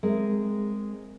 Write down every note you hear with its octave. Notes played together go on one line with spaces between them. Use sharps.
G#3 C4 A#4